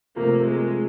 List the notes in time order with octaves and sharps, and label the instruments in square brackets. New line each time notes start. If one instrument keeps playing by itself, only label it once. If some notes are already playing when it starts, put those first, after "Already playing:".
[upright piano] C3 F3 A3 [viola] A#3
[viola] G#3